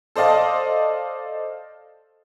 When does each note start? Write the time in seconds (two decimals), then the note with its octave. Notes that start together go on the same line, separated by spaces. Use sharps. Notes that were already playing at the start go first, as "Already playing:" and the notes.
0.16 A4 C5 D5 D#5 F5 A5